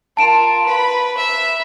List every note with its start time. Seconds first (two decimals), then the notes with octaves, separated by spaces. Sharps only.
0.17 F4 A#4 A5 D7 E7
0.66 B4 B5
1.17 E5 B5